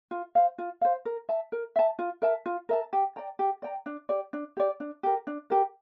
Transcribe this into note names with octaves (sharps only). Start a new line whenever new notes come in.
F4
C5 F5
F4
C5 F5
A#4
E5 A5
A#4
E5 A5
F4
A#4 E5 A5
F4
A#4 E5 A5
G4
D5 G5 A#5
G4
D5 G5 A#5
D4
G4 D5
D4
G4 D5
D4
G4 A#4
D4
G4 A#4